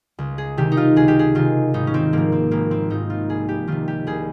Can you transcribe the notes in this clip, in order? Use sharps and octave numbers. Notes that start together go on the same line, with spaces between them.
C#2
G#4
C3 D#3 G4
D#4
F4
C#2 G#4
G4
G#4
C3 D#3 F4
G#1 D#4
C#4
C4
G#2 F3 A#3
C4
G#1 A#3
C4
G#2 F3 D#4
F4
C2 G#4
G4
C3 D#3 F4
G4
C2 G#4